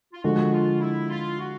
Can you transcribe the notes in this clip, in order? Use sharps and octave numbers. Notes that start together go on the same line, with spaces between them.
F4
D3 F3 G#3 F#4
F4
E4
F4
F#4